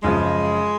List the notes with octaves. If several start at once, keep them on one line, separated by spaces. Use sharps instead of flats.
F#2 C#3 F3 G#3